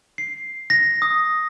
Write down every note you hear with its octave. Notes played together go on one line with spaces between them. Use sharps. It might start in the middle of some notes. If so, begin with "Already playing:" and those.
C7
A#6
D#6